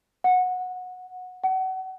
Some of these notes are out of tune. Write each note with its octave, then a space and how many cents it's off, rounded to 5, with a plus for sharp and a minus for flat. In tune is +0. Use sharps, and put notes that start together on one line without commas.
F#5 -15
F#5 +35